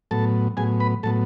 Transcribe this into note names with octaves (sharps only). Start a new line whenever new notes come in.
A2 F#3 B3 A4 A5
A2 F#3 B3 G#4 G#5
B4 B5
A2 F#3 B3 A4 A5